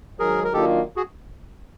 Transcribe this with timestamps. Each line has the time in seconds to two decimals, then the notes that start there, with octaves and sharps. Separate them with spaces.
0.19 G#2 D#3 F#3 G#4 A#4
0.44 A#4
0.53 D#3 F#3 A#3 D4 F4 G4 A4
0.96 F#4 G#4